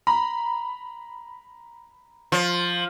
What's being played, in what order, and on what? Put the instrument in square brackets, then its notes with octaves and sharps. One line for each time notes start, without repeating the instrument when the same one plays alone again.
[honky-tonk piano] A#5 B5
[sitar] F3